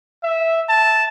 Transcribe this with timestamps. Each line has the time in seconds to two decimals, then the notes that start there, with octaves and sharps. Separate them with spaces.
0.23 E5
0.69 A5